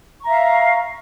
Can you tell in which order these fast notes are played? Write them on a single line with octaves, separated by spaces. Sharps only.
C#6 A#5 E5 F5